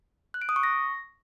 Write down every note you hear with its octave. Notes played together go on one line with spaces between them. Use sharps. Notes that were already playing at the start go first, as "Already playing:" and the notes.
F#6
D7
D#6
C#6
A#6